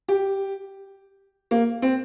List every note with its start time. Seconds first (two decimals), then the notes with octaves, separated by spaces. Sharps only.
0.08 G4
1.51 A#3
1.82 C4